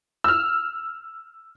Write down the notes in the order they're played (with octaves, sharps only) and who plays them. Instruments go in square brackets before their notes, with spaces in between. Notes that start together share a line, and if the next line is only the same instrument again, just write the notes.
[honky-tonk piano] E6 F6